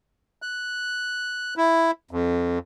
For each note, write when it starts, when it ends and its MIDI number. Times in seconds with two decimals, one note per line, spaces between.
0.42 1.54 90
1.57 1.91 64
2.11 2.59 41